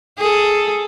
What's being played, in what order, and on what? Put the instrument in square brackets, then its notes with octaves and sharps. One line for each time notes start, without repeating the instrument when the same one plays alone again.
[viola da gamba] G#4 A4